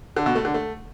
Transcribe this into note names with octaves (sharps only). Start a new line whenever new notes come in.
D3
B2
A3
D3
A3